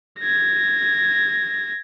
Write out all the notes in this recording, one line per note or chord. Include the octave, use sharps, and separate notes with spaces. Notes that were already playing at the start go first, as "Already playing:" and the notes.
G#6 A#6